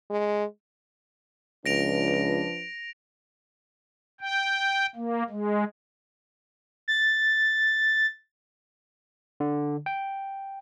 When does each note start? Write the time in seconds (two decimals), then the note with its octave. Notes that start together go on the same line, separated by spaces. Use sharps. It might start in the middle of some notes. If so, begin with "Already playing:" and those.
0.10 G#3
1.66 C#2 F3 D4 B4 A#6 D7 F7
4.21 G5
4.96 A#3
5.30 G#3
6.88 A6
9.40 D3
9.86 G5